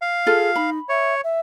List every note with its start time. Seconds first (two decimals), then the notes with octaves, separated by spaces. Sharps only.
0.02 F5
0.27 F4 G#4 A4
0.56 D#4 B5
0.89 C#5 E5
1.23 E5